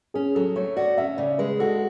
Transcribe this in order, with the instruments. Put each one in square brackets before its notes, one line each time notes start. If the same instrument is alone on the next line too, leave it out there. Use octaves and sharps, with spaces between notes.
[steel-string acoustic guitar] C#4 [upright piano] G#4
[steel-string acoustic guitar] F#3 [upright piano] A4
[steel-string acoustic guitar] A3 [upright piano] C#5
[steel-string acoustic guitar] F#4 [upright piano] D5
[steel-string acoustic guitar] C#4 [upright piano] E5
[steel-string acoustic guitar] C#3 [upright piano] D5
[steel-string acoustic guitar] G#3 [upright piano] B4
[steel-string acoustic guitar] F#4 [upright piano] A4